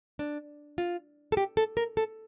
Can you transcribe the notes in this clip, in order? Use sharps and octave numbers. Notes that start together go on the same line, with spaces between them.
D4
F4
A4
G4
A4
A#4
A4